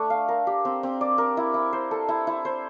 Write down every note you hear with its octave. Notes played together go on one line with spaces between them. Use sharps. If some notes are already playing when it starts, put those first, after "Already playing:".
Already playing: A3 D4
F5
A#4
G4
C4
C4
D5
A#4
E4
E4
C5
A4
E4
E4
C5